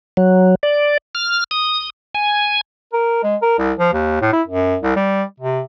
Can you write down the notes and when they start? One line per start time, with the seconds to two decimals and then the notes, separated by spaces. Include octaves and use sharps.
0.17 F#3
0.63 D5
1.15 F6
1.51 D#6
2.14 G#5
2.93 A#4
3.23 G#3
3.42 A#4
3.58 C2
3.79 F3
3.93 D#2
4.21 A2
4.33 E4
4.48 F#2
4.82 C2
4.96 G3
5.40 C3